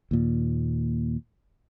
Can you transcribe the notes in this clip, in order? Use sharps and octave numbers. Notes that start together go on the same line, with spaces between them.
D#2 A#2